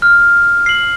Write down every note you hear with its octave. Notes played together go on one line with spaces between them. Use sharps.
F6
C7 F#7